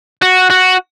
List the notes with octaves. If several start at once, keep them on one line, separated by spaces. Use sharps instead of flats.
F#4
F#4